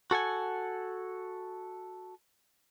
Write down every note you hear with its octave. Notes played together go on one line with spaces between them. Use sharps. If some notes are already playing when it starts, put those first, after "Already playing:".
F#4 A4 F#5 G#5